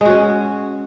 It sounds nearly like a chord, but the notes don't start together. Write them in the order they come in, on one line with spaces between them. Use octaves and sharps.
G#3 F#4 C#4